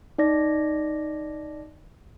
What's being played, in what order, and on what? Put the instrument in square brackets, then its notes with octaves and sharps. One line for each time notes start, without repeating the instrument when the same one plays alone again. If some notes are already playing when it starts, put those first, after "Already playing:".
[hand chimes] D#4 D5 A#6